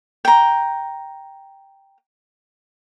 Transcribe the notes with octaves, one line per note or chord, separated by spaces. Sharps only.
G5 A#5